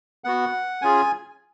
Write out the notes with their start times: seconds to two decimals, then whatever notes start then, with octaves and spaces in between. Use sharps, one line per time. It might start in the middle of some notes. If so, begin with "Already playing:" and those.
0.24 B3 F#4 F#5
0.82 C#4 F4 G#4 G#5